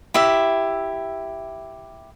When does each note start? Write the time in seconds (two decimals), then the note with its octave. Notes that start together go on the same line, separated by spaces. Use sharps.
0.14 E4 G4 E5